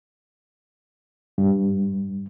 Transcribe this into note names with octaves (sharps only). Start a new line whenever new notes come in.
G2